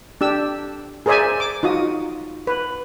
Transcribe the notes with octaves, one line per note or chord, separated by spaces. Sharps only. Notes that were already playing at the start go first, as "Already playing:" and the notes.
D4 G4 E6
G#4 A#4 C5 D5 E5 G#5
D6
D#4 F4 F#4 D#6
B4